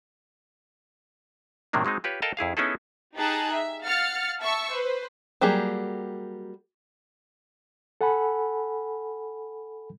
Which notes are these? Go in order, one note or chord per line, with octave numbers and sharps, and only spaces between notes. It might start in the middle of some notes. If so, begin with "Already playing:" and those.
A2 C3 D#3 F#3 A#3 D4
F#3 G#3 C4 D#4
F4 G4 B4 C#5
A4 A#4 D#5 F5 G5 A5
F2 E4 G#4 F5
B3 C#4 D#4 E4 G#4 A4
D#4 G4 G#4 A5 A#5 F#6
E5
F5 F#5 F6 A6 C#7
E5 A5 C#6 E6
B4 C5
F#3 G3 A#3 G4 G#4
A4 F#5 G#5 B5